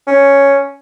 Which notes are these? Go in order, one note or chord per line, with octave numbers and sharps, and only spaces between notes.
C#4